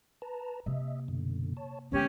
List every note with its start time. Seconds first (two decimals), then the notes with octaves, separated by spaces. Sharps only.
0.22 B4 A5 A#5
0.66 C3 A#3 D#5 E5
1.08 F#2 B2 D3
1.57 C#5 A5
1.92 D3 G#3 A#3 B3 C#4 G4